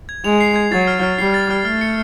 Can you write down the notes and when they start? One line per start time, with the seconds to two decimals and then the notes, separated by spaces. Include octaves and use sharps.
0.09 G#6
0.24 G#3 F7
0.40 C7
0.56 G#6
0.72 F#3 A6
0.87 F6
1.03 F6
1.18 G3 C7
1.34 A6
1.51 F6
1.65 A3 F6
1.81 C#7